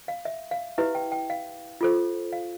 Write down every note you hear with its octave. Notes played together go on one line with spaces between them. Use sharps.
F5
E5
F5
E4 G4 B4 E5
G5
G5
F5
F4 A4 C5
F5